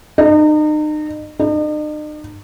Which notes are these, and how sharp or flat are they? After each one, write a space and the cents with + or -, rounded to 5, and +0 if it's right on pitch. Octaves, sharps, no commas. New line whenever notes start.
D#4 -35
D#4 -45